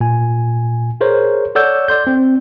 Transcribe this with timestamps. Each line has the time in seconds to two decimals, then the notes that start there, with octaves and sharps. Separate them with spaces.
0.01 A#2 G#5
1.01 G#4 A#4 C5 C#5
1.55 A4 C#5 D5 F#5 E6 G6
1.88 D5 C6 G6
2.07 C4